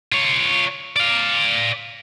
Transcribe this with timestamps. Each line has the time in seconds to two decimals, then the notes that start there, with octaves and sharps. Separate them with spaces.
0.12 F4 C#5
0.96 D5 F5